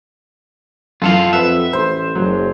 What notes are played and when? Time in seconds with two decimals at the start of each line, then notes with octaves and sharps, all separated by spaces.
1.02 F#2 E3 F4 A4 F5
1.33 F2 B4 E5 F#5
1.73 A1 C5
2.15 F#1 F#3